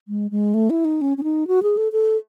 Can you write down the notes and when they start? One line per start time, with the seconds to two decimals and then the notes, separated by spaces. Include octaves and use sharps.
0.08 G#3
0.31 G#3
0.54 A3
0.70 E4
0.85 D#4
1.01 C#4
1.17 C#4
1.23 D#4
1.47 F#4
1.63 G#4
1.77 A4
1.92 A4